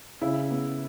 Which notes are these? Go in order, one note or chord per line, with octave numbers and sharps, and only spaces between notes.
C#3 E4
B3